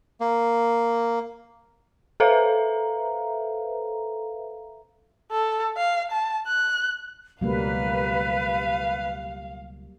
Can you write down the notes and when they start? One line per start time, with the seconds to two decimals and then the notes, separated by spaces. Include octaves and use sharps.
0.21 A#3
2.20 A4 B4 C5 E5 F5 A#5
5.32 A4
5.77 F5
6.11 A5
6.47 F#6
7.41 C#2 B2 F#3 G3 A#3 B4 F5